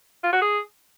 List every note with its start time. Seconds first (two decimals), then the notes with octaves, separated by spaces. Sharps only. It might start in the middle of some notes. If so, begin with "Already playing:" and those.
0.24 F4
0.32 F#4
0.41 G#4